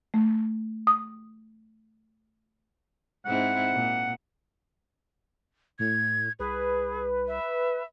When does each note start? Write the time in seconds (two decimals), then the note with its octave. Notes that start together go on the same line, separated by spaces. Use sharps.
0.14 A3
0.87 D#6
3.25 G#2 C4 E4 F#5
3.73 A#2
5.79 A2 G#6
6.39 C2 G#4 B4
7.28 E5